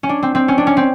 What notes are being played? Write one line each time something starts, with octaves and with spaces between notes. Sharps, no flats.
C#4
D4
C4
C4
C#4
D4
C#4
C4